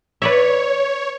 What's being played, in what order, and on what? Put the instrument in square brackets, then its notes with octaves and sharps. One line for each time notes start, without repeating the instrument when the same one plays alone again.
[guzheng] B4 D5 E5 [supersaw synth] C#5